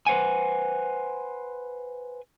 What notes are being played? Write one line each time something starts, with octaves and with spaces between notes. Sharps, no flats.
B4 C5 F#5 G#5